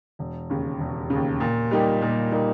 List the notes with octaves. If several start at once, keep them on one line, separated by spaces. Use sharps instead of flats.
E1
D#2 C#3
E1
D#2 C#3
A#2
G3 A#3 D#4 G4
A#2
G3 A#3 D#4 G4